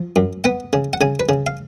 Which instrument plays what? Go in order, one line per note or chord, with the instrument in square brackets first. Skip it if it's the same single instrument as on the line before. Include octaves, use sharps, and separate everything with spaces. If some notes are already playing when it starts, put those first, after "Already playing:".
Already playing: [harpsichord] F3
F#2
B3 F#5
C#3
F#5
C#3 G#5
B4
C#3
F5